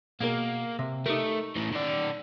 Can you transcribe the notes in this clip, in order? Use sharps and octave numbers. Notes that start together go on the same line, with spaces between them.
B2 A#3 G#4 A#4
C3
A3 D#4 G4 A#4
A2 E3
D#3 D5